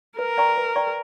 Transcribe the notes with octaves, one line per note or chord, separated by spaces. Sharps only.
A#4 B4
D5 G5 A#5 C#6
B4
D5 G5 A#5 C#6